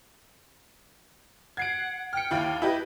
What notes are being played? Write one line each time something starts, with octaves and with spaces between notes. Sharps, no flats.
F#5 G#6 C7 D7
G5 F6 C#7
D#2 E4 F5
E4 G4 B4 D#5